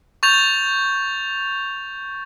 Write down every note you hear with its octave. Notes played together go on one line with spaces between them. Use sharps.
C#6 G6 A6 F7